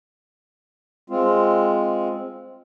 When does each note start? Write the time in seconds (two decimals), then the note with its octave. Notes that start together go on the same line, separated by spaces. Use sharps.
1.10 G#3 C4 F4